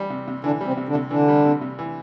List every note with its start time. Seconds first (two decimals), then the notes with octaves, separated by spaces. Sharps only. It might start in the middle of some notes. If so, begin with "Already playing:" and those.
Already playing: E3 G3
0.10 C3
0.28 C3
0.44 D3 E3 D4
0.61 G3
0.66 C3 C4
0.77 C3
0.88 D3 D4
0.95 C3
1.11 D3 E3 D4
1.28 G3
1.44 C3
1.61 C3
1.79 E3